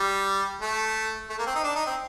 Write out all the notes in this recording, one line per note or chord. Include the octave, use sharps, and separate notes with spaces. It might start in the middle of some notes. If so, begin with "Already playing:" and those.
Already playing: G3
A3
A3
A#3
C4
D#4
D4
D#4
C4